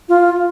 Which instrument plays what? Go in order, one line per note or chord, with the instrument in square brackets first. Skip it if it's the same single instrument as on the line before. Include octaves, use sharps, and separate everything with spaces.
[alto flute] F4